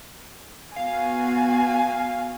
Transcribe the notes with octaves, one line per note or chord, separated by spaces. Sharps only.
B3 F#4 F5 G#5